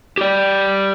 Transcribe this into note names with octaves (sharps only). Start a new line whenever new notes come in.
G4 D5